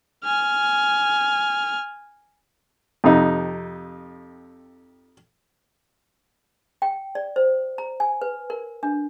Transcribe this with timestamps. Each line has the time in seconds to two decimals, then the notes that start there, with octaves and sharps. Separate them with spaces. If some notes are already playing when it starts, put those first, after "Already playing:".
0.24 G#5 F6
3.04 F2 C3 D#4
6.82 G5
7.15 D5
7.36 C5
7.78 A#5
8.00 G#5
8.22 B4
8.50 A#4
8.83 D4